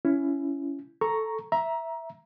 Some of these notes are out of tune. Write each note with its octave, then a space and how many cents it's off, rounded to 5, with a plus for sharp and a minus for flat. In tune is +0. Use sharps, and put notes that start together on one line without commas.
C#4 +10 E4 +20
A4 +0 A#5 +0 C#6 +0
E5 +0 A#5 +15